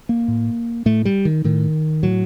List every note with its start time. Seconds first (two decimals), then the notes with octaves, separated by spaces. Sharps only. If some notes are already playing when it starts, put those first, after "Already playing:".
0.09 A#3
0.28 A2
0.86 A2 A3
1.05 G3
1.25 D#3
1.44 A2 D#3
2.03 A2 F#3